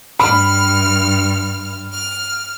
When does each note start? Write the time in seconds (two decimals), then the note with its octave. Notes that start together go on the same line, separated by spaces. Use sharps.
0.20 G2 B5 F6
1.92 F6